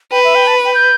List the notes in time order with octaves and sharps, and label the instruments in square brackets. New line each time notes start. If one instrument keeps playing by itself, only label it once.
[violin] B4 [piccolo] G5
[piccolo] E5
G5
A5
G5
G6